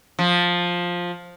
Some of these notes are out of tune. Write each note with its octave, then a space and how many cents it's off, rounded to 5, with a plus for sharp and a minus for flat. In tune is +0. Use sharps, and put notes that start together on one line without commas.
F3 +10